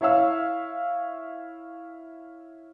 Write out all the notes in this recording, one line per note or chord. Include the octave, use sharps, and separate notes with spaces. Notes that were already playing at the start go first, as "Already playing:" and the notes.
E4 C#5 E5 F5 E6